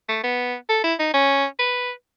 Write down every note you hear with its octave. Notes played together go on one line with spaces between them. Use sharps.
A3
B3
A4
E4
D#4
C#4
B4